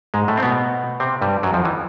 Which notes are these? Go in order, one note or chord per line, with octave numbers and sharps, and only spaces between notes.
G#2 G#3
A2 A3
C4
B2 B3
C3 C4
G2 G3
F#2 F#3
F2 F3
E3